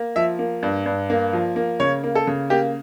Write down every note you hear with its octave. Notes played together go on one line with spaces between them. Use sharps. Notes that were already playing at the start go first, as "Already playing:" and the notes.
Already playing: A#3
F3 E5
A#3
G2
G2
A#3
F3
A#3
C#3 C#5
A#3
A4
C#3
A#3 G4